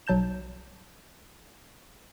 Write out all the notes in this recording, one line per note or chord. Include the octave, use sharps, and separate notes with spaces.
B1 F#3 A5 G6 E7